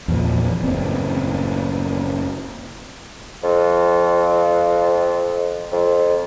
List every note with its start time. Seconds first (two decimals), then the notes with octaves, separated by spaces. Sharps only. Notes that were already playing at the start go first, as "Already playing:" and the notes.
0.08 E2 A#2 F3
0.64 F#1 A2 C4
3.43 F2
5.72 F2